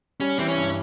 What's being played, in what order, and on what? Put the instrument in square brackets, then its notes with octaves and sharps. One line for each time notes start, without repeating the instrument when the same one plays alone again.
[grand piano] G3 [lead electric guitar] C#4
[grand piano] E3 [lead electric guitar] C4
[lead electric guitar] C#4
[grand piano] G2